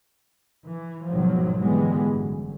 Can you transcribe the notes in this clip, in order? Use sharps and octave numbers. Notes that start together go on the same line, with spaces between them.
E3
G#1 B2 D#3 F3 F#3
A#2 D3 E3 G3 G#3 B3
G1 F#2